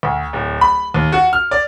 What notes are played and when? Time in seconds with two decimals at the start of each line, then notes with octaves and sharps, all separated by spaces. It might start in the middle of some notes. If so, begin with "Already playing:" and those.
0.03 D2
0.33 D1
0.61 B5
0.94 D#2
1.12 F#4
1.33 F6
1.51 D5